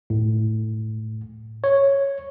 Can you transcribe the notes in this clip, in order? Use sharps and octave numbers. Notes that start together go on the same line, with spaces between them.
A2
C#5